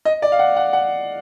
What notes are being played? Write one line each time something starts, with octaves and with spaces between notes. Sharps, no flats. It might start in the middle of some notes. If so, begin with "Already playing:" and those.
D#5
D5
F5
F#5
F#5
F#5